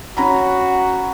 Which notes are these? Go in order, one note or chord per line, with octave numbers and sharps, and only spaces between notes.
C#4 F#4 A#5 B5